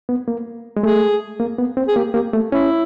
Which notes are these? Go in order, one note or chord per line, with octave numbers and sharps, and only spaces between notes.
B3
A#3
G#3
A3 G#4
A#3
B3
C4
G#4
A#3 G4
A#3 G4
A3
C#4 E4